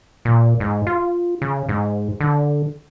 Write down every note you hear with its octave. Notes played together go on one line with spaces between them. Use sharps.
A#2
G#2
F4
C#3
G#2
D3